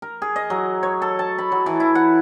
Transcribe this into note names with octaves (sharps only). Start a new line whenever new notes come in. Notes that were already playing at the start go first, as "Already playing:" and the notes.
A#4
G#4
D#5
F#3
C#5
A4
A5
B5
F#3
E3
E4
F#5